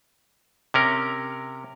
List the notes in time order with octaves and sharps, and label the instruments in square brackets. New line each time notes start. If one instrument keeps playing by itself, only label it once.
[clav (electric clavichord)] C3 C#4 A#4